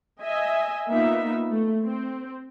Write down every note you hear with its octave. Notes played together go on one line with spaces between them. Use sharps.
D#5 E5 G#5
A#3 B3 D#4 F4 E5
A3
C4